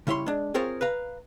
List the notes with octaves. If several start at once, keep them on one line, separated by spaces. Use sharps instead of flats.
C#3 G3 E4 C#5 C6
G#3 D4
C4 F4 G#4 A#4 C5 C#5
B4 F5 A#5